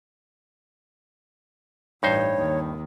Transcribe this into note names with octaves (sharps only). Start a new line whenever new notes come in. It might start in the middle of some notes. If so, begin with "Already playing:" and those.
A1 G2 D#4 C5 C#5
D#2 D#3